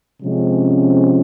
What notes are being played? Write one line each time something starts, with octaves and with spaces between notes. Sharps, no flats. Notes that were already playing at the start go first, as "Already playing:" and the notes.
C3 F3 G#3 C#4